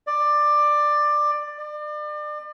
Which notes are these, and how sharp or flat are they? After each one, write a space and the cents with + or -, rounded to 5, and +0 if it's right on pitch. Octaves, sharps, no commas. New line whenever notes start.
D5 +15
D5 +35